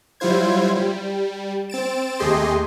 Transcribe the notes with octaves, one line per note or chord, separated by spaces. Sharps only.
F#3 G3 E4 F4 C5 G#6
G3
C4 A6 D7 E7
D#2 A3 G4 G#4 D#5 C6